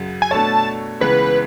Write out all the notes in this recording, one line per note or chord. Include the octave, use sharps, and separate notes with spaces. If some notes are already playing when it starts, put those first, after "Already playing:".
Already playing: F#2 C#3 F#3
G#5
B2 A3 D4 A4 C#5 A5
C#2 C#3 E3 B3 B4